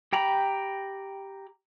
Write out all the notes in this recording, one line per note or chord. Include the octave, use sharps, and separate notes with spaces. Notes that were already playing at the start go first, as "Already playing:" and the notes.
G4 G5 A#5 B5